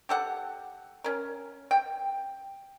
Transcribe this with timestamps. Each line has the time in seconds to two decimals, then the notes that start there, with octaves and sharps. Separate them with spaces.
0.09 G4 A4 F#5
1.04 C#4 A#4
1.71 G5